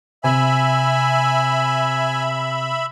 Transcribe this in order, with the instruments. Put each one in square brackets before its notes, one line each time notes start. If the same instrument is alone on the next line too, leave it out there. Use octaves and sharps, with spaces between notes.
[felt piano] C3 [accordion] E5 B5 [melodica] G#5